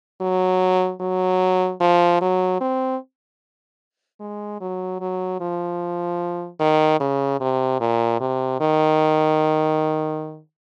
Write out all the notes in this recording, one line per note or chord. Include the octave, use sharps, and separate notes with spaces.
F#3
F#3
F3
F#3
C4
G#3
F#3
F#3
F3
D#3
C#3
C3
A#2
C3
D#3